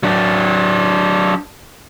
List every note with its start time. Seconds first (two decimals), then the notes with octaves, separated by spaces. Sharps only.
0.03 F#3 D4